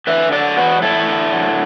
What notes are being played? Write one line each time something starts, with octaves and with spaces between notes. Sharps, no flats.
D3 B4 E5
F#3 A4 D5
E2 F#4 B4
E2 E4 A4
D3
F#3